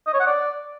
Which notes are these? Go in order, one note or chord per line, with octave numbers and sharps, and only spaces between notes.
D#5
C#5
F#5
D5